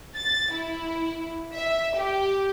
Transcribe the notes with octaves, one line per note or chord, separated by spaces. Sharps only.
A6
E4
E5
G4